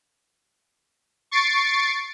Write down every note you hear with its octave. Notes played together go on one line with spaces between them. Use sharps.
C#6 A6 C7 D7